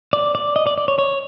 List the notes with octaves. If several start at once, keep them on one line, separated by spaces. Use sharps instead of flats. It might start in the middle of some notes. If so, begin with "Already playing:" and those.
D5
D5
D#5
D5
D5
C#5
C#5